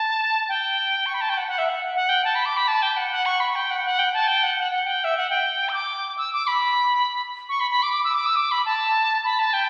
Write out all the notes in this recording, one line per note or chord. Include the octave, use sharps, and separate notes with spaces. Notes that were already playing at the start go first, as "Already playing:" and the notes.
Already playing: A5
G5
C#6
B5
A5
G5
F#5
F#5
E5
F#5
F#5
G5
A5
B5
D6
B5
A5
G5
F#5
F#5
C#6
B5
G5
F#5
F#5
G5
A5
G5
F#5
F#5
F#5
G5
E5
F#5
G5
E6
D6
E6
D6
B5
C#6
B5
B5
D6
D6
E6
D6
E6
D6
B5
A5
B5
A5
G5